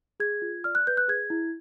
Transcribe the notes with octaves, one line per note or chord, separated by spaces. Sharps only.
G#4 G#6
F4
D5 F6
F#6
B4 G6
F#6
G#4 G#6
E4